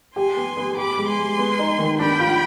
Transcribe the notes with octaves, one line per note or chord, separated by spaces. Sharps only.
G4 G#5 C6
B3
B3
G4 B5 D6
G#3
G#5 C6
G#3
B3
D#4
D#3
D4 G5 B5
F4